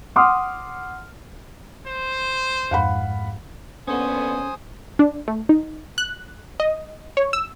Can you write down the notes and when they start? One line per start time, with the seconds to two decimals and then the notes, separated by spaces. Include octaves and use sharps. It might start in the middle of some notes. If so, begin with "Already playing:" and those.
0.16 F#5 C6 D6 D#6 F6
1.88 C5
2.71 F2 G#2 F5 F#5 B5
3.87 A#2 D3 B3 C#4 A4 C5 G#5 D#6
4.99 D4
5.28 A3
5.49 D#4
5.98 F#6
6.60 D#5
7.17 C#5
7.33 E6